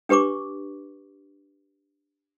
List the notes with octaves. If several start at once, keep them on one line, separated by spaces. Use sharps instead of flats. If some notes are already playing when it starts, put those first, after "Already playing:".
D4 G4 B4 C#6 D6